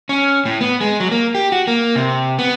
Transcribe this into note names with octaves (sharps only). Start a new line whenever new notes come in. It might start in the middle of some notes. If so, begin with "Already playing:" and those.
C#4
A2
B3
G#3
F#3
A#3
G4
F#4
A#3
C3
B3